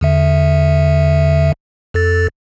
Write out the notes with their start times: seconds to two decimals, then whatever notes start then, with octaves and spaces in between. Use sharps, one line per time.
0.01 E2 D3 E5
1.94 F2 A4 A6